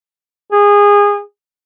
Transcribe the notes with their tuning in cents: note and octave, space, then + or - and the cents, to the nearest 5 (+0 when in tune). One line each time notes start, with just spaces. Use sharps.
G#4 -25